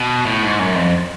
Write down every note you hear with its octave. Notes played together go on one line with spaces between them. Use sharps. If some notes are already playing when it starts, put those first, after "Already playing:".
Already playing: B2
A2
G#2
F#2
F2